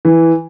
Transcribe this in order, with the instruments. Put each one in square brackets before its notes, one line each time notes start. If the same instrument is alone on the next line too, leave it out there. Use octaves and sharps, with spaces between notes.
[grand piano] E3